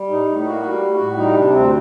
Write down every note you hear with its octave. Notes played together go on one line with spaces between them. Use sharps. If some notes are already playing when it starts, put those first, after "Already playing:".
Already playing: G3
A2 D#4
A2
D#4
A#3 F#4
G3
A2
F#4
A2
G3 D#4
C3 D4
D2 C4